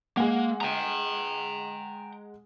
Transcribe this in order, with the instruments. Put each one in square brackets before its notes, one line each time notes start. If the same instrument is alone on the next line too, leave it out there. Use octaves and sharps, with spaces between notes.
[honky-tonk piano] G#3 F#5 [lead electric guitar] A#3
[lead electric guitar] G5 A#5